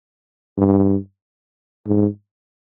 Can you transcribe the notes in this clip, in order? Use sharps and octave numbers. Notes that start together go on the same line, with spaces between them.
G2
G#2